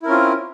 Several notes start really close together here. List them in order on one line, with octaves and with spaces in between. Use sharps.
E4 A#4 C#4 F4 C4